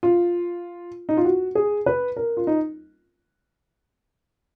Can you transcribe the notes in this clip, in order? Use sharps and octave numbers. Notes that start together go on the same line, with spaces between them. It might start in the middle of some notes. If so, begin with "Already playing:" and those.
F4
D#4
F4
F#4
G#4
B4
A#4
F4
D#4